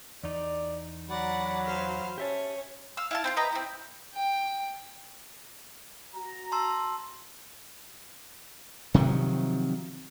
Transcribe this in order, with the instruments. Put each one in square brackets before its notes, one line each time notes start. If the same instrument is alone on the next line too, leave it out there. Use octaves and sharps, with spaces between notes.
[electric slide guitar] E2 D#4 [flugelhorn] D5
[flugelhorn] F#3 [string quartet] D5 F#5 A#5 [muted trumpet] B5
[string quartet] C5 F5 F6
[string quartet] C#4 C#5 [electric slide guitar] G4 E5 A5
[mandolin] F5 E6
E4 F5 A5
C4 E4 F4
B4 D#5 G5 A#5
C4 E4
[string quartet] G5
[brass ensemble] F#4 A#5
[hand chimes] A5 C6 E6
[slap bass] C3 D#3 F3 F#3